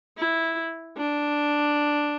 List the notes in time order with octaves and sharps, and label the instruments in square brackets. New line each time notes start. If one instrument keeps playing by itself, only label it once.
[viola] E4
D4